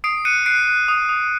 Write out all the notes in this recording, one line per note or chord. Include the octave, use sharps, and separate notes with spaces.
D#6 C7 D7
F#6 C#7 D#7
F#6 C7 D7
F#6
D#6
D#6